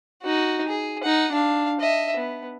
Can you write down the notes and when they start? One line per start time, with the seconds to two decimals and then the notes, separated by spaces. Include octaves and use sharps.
0.23 D#4 F#4
0.68 G#4
1.03 D#4 F#5
1.32 D4 F5
1.80 D#5 E5
2.16 B3